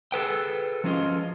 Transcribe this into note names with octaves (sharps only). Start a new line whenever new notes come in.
G#4 A4 B4 G5
F3 C#4 F4 D#5